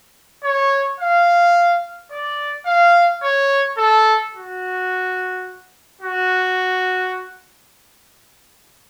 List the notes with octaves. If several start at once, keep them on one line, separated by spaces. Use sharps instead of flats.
C#5
F5
D5
F5
C#5
A4
F#4
F#4